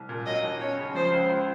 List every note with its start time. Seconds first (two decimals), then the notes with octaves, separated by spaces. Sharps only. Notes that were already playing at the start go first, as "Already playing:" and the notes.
Already playing: C2
0.09 A#2
0.26 F#3 D#5
0.43 D#2
0.60 C#4 C#5
0.78 C#3
0.95 F3 C5
1.12 C#2
1.29 C#2